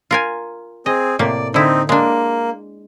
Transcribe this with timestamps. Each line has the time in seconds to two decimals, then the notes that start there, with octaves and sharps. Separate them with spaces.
0.11 F4 A#4 G#5
0.86 C4 G#4 D#5
1.19 A2 C3 A#3 D5
1.54 D3 C4 D#4 E4
1.89 G#3 A#3 D4